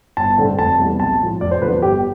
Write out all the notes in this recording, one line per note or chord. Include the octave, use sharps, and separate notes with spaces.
G1 A5
G2 D3 A3 C4
F1 A5
E2 C3 G3
B1 A5
A2 F3
F1 D5
C5
E2 D3 F3 B4
G1 G4